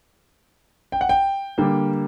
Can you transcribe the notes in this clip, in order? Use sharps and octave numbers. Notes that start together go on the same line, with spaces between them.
G5
F#5
G5
D3 G3 A#3